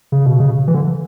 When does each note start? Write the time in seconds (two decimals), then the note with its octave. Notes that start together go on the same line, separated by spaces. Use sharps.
0.12 C#3
0.26 B2
0.40 C#3
0.68 E3
0.74 D3